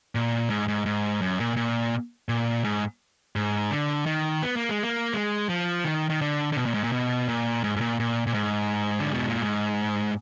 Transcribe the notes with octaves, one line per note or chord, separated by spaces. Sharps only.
A#2
G#2
G#2
G#2
F#2
A#2
A#2
A#2
G#2
G#2
D3
D#3
B3
A#3
G#3
A#3
G#3
F3
D#3
D#3
D3
D3
B2
A#2
G#2
A#2
B2
A#2
G#2
G#2
A#2
A#2
A#2
G#2
D3
B2
A#2
G#2